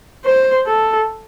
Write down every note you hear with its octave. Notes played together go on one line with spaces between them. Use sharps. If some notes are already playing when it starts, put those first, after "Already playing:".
C5
A4